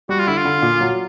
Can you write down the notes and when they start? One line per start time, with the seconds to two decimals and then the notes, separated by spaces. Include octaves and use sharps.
0.09 G3 F#4
0.19 F4
0.27 D3 E4
0.37 F4
0.45 D3
0.62 A#2
0.81 F#3